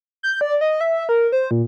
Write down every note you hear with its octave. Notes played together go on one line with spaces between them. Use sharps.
G6
D5
D#5
E5
A#4
C5
A#2